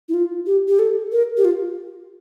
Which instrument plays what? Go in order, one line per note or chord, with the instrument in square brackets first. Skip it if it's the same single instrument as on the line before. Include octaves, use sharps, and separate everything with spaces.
[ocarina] E4
F4
G4
G4
A4
A#4
G4
F4